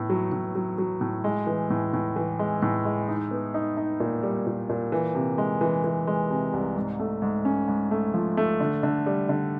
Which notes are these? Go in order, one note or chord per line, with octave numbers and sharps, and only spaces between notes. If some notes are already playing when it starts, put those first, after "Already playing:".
Already playing: A2 B3
F#3
A2
F#3
F#3
A2
G#3
E3
A2
A2
E3
G#3
A2
G#3
D#4
B3
D#4
D#4
A#2
G3
A#2
A#2
E3
C3
G#3
E3
E3
G#3
C3
C2
G#2
A3
G#2
C#4
G#2
A3
F3
A3
D3
D3
G3
D3